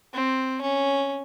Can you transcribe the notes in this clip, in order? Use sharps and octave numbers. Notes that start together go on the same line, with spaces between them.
C4
C#4